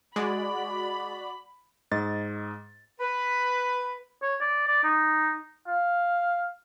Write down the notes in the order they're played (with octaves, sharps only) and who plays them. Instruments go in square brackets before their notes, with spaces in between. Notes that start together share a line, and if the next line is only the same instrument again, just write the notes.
[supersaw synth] G#3 [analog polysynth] F#4 D5 [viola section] B5
[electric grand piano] G#2 D#5 A6
[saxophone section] B4
[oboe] C#5
D5
D5
D#4
F5